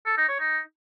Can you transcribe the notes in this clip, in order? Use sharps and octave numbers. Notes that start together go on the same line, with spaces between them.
A4
D#4
C#5
D#4